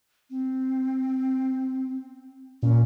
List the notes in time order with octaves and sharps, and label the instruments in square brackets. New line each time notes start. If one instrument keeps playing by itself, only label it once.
[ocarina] C4
[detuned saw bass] A#2 [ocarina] C#4